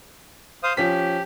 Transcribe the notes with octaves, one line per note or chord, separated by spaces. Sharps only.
C5 F5 D#6
F3 C#4 G4 B6